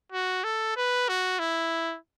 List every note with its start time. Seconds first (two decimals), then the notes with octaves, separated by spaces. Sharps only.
0.12 F#4
0.44 A4
0.76 B4
1.08 F#4
1.39 E4